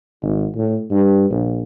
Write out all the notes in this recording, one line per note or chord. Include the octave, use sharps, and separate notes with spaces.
G#1
A2
G2
A#1